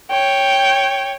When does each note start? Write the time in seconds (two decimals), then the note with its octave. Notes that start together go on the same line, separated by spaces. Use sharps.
0.11 C#5 G5